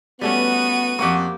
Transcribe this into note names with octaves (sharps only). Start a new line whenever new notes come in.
G3 A3 B3 C#4 F#4 D#7
F2 A#3 G4 F#5 C#6